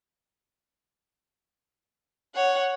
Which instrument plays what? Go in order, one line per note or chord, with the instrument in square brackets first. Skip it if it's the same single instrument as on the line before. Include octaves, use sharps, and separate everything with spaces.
[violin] C#5 [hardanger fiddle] F#5